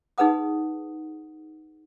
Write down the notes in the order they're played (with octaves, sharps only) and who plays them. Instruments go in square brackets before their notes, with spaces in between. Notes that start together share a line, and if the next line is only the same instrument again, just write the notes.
[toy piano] D#4 G#4 B4 F#5 D#6